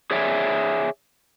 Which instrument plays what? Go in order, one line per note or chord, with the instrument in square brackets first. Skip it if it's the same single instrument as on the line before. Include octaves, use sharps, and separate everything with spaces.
[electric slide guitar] G#4 C#5 D5 E5 G5 G#5